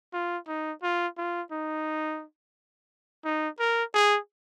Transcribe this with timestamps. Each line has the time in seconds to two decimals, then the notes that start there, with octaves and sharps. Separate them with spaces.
0.14 F4
0.48 D#4
0.83 F4
1.18 F4
1.52 D#4
3.25 D#4
3.59 A#4
3.94 G#4